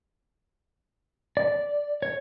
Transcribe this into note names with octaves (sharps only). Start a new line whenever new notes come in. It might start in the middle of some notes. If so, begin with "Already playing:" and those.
D5
C#5